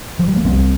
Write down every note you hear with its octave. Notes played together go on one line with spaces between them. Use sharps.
F3
G3
A#3
C2 C3 G3 C4